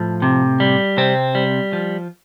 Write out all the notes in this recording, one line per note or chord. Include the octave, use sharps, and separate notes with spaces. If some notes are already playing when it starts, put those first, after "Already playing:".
Already playing: A2 F3
C3
G3
C3 C4
G3
F3